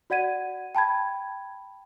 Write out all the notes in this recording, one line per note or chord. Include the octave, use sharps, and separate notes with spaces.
F#4 D5 F#5 G#6 D#7
G5 A5 B5 G#6